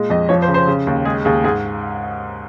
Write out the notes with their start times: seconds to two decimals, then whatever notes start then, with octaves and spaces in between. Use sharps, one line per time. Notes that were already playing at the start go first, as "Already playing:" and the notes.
Already playing: A#2 G#3
0.10 F2 D#5
0.29 F3 C#5
0.42 C5
0.48 C#3
0.54 C5
0.67 C#3
0.87 D#2
1.05 G#3 G#4
1.25 D#2 G#4
1.44 G#2 G#4